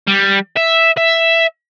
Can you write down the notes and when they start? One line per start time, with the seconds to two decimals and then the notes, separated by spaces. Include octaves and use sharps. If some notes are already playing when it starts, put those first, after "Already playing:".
0.07 G3
0.56 E5
0.97 E5